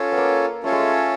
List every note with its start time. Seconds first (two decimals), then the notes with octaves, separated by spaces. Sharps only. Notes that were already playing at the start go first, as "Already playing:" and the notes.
Already playing: C#4 F4 A4 C#5
0.12 B3
0.18 A#3
0.64 A3 C#4 F4 A4 C#5
0.72 G#3
0.80 A3